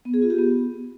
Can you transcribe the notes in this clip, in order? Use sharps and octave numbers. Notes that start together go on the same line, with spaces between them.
B3
G#4
F4
G4
B3